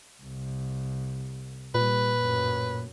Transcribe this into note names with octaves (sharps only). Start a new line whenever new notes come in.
C2
A#2 G3 B4
F#2 A2